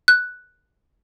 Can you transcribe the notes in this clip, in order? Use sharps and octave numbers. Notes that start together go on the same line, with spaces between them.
F#6